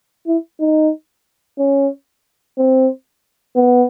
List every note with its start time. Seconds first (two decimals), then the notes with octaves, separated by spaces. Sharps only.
0.27 E4
0.60 D#4
1.59 C#4
2.58 C4
3.56 B3